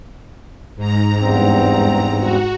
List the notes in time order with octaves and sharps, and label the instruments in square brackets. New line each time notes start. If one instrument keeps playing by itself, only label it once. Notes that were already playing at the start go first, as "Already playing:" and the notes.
[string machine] G#2 A#5
[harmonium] E2 G2 C4
[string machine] F#4